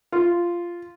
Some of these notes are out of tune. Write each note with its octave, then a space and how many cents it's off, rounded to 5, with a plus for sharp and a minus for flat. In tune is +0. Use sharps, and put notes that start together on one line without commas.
F4 -10